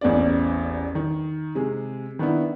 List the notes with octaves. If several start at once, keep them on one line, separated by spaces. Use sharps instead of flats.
A1 E2 C4 C#4 D5
D#3
C3 G#3 G#4
D#3 B3 D4 E4